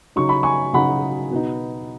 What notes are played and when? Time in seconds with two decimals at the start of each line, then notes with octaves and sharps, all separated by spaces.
0.16 C#3 F#3 D#4 C#6
0.29 B5
0.43 G#5 C#6
0.73 C#3 F#3 D#4 F#5 B5
1.31 B2 B3 D#4